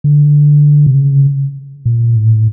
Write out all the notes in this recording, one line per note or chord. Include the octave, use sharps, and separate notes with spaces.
D3
C3
C#3
A#2
A2